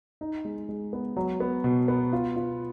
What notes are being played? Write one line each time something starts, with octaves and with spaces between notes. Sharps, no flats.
D#4
G#3
G#3
B3
F#3
B3
B2
B3
F4
F4